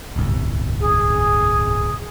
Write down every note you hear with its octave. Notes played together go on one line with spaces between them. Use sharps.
D1 G1 C2
G#4